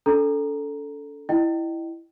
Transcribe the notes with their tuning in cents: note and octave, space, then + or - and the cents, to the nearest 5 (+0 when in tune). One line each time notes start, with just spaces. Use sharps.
D4 -45 A4 +0 A#5 +0
E4 +0 D#5 -25 G5 -25